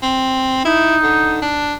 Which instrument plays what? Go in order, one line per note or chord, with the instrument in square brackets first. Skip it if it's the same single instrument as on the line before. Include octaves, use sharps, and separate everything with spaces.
[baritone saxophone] C4
[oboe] D#4 [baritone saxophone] E4
[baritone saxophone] D3
D4